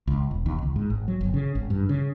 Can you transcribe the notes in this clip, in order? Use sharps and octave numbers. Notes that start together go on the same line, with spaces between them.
C#2
E1
D#2
C#2
G#2
G#1
F#3
G1
C#3
G#1
G2
C#3